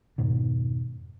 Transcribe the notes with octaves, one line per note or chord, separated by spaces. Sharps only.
F2 G#2 B2 D#3